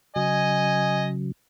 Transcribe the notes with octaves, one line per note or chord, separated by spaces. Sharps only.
C#3 F#3 D#5 G#5